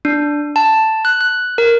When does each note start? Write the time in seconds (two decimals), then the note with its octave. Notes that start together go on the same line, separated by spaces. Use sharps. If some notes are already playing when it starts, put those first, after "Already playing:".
0.05 D4
0.56 A5
1.05 F#6
1.21 F#6
1.58 A#4